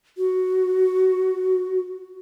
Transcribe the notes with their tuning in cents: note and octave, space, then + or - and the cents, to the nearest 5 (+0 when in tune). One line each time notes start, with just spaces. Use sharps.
F#4 +5